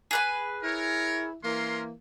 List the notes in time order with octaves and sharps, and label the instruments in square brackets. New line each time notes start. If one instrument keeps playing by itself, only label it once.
[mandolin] G#4 B4 G#5
[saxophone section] E4 [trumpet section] A#4 C#5
[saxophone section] E3 A#3 [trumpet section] C#4 A#4 C6